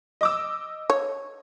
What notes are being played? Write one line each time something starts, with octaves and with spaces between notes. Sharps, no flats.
D#5 D6 E6
C#5